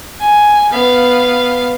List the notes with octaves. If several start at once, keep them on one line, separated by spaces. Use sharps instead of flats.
G#5
B3 F5